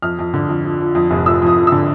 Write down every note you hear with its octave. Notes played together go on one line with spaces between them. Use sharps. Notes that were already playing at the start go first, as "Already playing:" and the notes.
F2 F6
F2
D3
F2
F3
F3
F2
F1
F3 E6
F2 D#6
F3
D3 E6